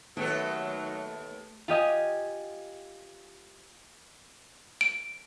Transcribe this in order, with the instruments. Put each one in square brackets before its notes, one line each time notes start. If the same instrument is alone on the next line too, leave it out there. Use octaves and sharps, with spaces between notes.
[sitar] D#2 B3 A4 [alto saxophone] F#3 [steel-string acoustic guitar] A3
[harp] F4 G4 D#5 G#5
[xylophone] D7